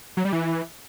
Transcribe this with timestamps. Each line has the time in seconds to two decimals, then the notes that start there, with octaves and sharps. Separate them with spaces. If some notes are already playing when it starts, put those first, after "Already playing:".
0.17 F#3
0.25 G3
0.33 E3